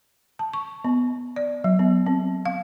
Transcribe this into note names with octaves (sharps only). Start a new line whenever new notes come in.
A5
C#6
B3
D5
F#3
B3
C4
F5